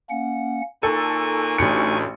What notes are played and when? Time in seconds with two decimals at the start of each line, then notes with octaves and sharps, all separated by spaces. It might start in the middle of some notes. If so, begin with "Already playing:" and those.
0.10 A#3 C#4 F#5
0.83 A#2 D#4 A4 G#5 C#6
1.58 A1 D2 C#7